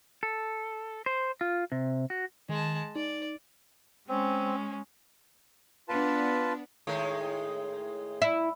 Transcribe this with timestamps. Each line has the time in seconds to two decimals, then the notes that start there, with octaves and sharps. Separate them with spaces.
0.23 A4
1.06 C5
1.41 F4
1.72 C3
2.10 F#4
2.49 D#3 G#3 A5
2.96 D#4 D5
4.09 G#3 C4 C#4
5.89 B3 D4 F4 B4 A5
6.87 A2 D#3 G#3
8.22 E4